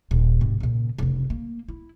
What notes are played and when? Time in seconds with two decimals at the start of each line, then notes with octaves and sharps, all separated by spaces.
0.11 D#1
0.40 G#2 C3
0.60 A#2 C#3
0.98 F1 C#3
1.30 A#3
1.68 E4